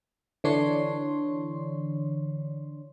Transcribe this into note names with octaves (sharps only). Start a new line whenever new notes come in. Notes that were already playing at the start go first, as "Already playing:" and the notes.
D3 E3 D4 C#5 C6